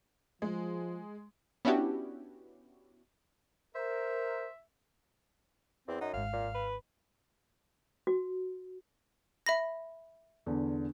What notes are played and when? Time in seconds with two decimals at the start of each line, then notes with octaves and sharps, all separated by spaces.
0.42 F3 G#3
1.65 B3 C#4 D4 E4 F#4 G4
3.75 A#4 C5 E5
5.88 E2 C4
6.01 F#2 D#4 F#5
6.14 G#1 G#2 F5
6.33 A#2
6.54 B4
8.07 F#4
9.46 E5 B5 A#6
10.46 E2 D3